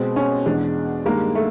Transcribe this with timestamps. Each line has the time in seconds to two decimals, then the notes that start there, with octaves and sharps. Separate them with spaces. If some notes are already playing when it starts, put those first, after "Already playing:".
Already playing: B2 G#3 C4
0.16 C#4
0.46 E2 B2 G#3 D4
1.06 G2 D#3 G#3 A#3
1.35 A3